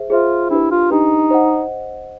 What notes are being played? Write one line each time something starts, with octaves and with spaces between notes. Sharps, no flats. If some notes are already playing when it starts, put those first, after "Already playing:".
Already playing: G#4 C5 E5
F4 G#4 C5 E5
D4 E4 G4 B4
F4
D4 D#4 G4 B4
C5 D#5 F#5